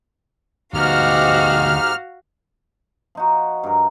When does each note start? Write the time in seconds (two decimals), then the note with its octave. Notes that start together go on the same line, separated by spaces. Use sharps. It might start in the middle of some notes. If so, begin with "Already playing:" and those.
0.74 D2 G#2 B3 D#4 F#4 G4 F5 F6
3.15 F3 D#4 F#4
3.63 G2 A#4